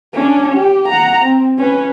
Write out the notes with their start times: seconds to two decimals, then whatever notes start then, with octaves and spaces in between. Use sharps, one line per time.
0.13 C#4 D4
0.52 G4
0.89 F#5 A#5
1.21 C4
1.58 C#4 B4